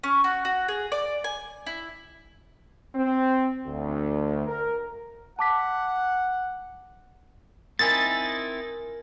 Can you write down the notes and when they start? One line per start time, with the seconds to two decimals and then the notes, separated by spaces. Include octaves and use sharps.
0.03 C#4
0.24 F#4
0.45 F#4
0.68 G#4
0.92 D5
1.24 G#5
1.66 E4
2.94 C4
3.65 D2
4.46 A#4
5.39 F#5 A5 D6 B6
7.79 C4 D#4 E4 A#4 G#5 A6